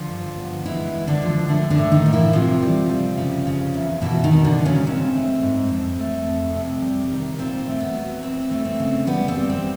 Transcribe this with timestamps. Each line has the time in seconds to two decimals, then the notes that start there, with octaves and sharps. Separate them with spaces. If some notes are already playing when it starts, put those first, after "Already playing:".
Already playing: D3 F3 F4
0.09 G2
0.37 B3
0.65 E3 G#3 E4
0.94 G#3
1.07 D3 D4
1.22 F3
1.49 A2 D3 D4
1.70 D3 D4
1.78 A2
1.92 D#3 D#4
2.06 A#3
2.13 E3 E4
2.33 C3 F3 F4
2.62 G3
2.89 G3
3.18 C#3
3.47 C#3
3.74 E2
4.02 B2 E3 E4
4.24 D#3 D#4
4.31 B2
4.45 D3 D4
4.59 F#3
4.66 C#3 C#4
4.86 G#2 C4
5.14 A3
5.42 G#2
5.70 F2
5.99 A3
6.27 F2
6.55 C3
6.82 G3
7.10 D#3
7.39 A#2 C4
7.67 A3
7.80 B3
7.95 F#3
8.22 E3 C4
8.51 A3
8.65 C4
8.80 C#3
9.07 G3 B3
9.28 C4
9.36 G3
9.50 C4